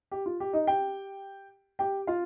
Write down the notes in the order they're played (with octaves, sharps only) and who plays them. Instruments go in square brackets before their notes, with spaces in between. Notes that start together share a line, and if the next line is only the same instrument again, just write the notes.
[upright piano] G4
F4
G4
D#4 D#5
G4 G5
G4 G5
F4 F5